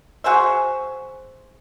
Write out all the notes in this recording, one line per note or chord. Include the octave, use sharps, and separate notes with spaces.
F#4 G#4 C5 E5